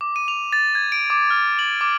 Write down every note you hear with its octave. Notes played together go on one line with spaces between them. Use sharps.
D6
D#7
F7
A6
G#6
D7
D6
F6
F#7
D6